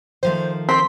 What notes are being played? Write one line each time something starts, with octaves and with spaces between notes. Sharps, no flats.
D#3 F3 A3 C5
C4 C6 B6